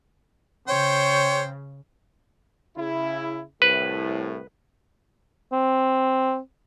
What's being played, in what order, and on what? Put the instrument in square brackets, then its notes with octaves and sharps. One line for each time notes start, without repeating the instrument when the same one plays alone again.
[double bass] C#3 [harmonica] C5 G5 [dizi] C#5
[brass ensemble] C#3 E4
[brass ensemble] C2 A2 [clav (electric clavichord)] B4
[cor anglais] C4